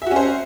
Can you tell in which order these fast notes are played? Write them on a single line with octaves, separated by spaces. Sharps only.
E5 F#4 C#4 C5